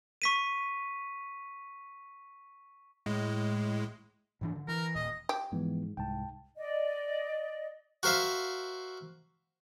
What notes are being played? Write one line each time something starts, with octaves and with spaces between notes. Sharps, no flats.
C#6 B6 D#7
A2 G#3
G#2 E3 D4
D3
E3 A#4
D#1 A#2 D#5
G4
G#2 E3 F3 B3
C2 G#2 G5 A5
D5 D#5
F#4 A#4 C5 E5 F5